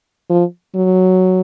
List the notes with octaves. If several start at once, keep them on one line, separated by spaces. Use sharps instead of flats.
F3
F#3